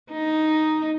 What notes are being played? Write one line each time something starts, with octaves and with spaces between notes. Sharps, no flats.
D#4